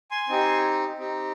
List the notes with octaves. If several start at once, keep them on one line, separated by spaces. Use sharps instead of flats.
G#5 C6
C4 D#4 G4
C4 D#4 G4